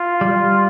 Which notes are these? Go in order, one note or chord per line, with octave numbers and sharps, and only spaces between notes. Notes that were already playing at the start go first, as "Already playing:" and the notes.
Already playing: F4
G3